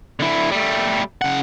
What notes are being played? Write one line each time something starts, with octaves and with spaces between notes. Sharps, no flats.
D3 E4
G3 A3
C#3 F#5